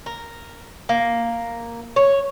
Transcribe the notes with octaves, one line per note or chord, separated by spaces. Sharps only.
A#4
A#3
C#5